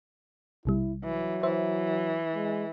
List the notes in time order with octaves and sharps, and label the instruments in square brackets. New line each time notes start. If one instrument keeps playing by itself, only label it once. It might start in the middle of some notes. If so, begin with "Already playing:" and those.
[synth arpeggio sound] B1 C3 G3 [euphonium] E4
[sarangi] E3 [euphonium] F#3
[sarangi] E3 [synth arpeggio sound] C5 E5
[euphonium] G#3